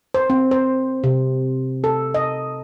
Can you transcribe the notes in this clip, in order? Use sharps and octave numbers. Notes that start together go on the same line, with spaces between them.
C5
C4
C5
C3
A4
D#5